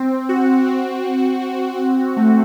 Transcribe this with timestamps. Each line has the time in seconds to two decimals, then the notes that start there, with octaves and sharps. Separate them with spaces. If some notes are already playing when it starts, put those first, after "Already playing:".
Already playing: C4
0.29 F#4
0.67 C4
1.04 C4
1.42 C4
1.79 F#4
2.17 A3